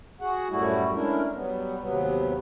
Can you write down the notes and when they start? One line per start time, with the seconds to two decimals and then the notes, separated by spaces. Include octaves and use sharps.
0.21 F#4 G#4 F#5
0.50 F#2 A2 G3 A3 E4 F#4
0.93 G#3 A3 C#4 D4 E4 A#4
1.33 F#3 G3 B3
1.79 D#2 C3 F#3 B3